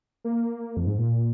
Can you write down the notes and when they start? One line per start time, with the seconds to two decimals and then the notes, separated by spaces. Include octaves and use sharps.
0.24 A#3
0.77 F2
0.87 G#2
0.98 A#2